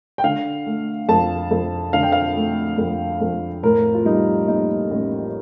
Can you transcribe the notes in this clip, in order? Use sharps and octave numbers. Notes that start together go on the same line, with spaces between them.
G5
D3 F5
A3
F2 A5
F2
D3 F5
G5
F5
A3
F2
F2
A2 A#4
F4
G3 D#4
A#3 D#4
A1